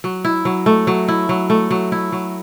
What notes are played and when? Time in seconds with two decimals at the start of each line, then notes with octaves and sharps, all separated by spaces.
0.04 F#3
0.25 E4
0.45 F#3
0.66 A3
0.87 F#3
1.08 E4
1.29 F#3
1.50 A3
1.71 F#3
1.92 E4
2.12 F#3